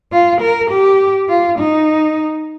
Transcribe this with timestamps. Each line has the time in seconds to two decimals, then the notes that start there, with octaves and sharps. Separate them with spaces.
0.12 F4
0.41 A#4
0.71 G4
1.29 F4
1.59 D#4